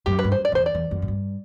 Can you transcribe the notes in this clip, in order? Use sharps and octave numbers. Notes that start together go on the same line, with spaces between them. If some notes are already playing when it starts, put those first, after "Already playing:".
F#2 G4
B4
G2
F#2 C5
D5
F#2
E2 C5
D5
E2
F#2
A2
G2